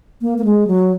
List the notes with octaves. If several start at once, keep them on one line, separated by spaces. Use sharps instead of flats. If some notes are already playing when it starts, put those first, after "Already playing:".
A#3
A#3
G#3
F#3